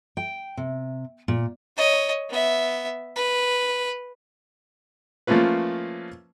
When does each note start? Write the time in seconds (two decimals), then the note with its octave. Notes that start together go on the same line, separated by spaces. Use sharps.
0.17 G5
0.57 C3
1.28 A#2
1.77 C#5 D#5
2.30 B3 E5
3.16 B4
5.27 F3 A3 A#3 C#4 F4 B4